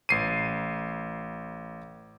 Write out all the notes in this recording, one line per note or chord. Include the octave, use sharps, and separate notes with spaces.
A1 C7 D#7